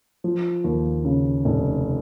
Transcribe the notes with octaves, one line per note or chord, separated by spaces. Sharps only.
F3
D#2
C#3
F1